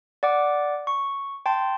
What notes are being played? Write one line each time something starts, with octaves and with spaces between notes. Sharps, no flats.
D5 F#5 D6
C#6
G5 A5 C6